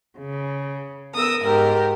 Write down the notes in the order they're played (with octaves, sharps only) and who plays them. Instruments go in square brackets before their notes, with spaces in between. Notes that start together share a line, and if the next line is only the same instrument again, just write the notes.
[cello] C#3
[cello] B3 A#4 [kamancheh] D#6 E6
[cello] G#2 [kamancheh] G4 A#4